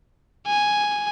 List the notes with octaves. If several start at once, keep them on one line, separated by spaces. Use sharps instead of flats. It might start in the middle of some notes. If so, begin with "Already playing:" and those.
G#5